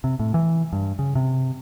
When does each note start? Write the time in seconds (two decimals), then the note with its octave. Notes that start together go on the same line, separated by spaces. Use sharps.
0.04 C3
0.20 A2
0.34 E3
0.73 G2
0.99 C#3
1.15 C3